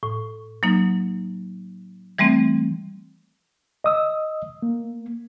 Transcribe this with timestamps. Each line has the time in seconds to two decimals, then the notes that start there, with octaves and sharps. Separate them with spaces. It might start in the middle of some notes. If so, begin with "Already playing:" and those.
0.03 A2
0.63 F#3 A#3 D#4
2.18 E3 G3 A3 C4
3.84 D#5 D#6 E6
4.62 A#3